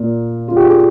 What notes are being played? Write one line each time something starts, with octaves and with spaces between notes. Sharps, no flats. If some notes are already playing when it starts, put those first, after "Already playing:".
Already playing: A#2 A#3
F4
G4
G#4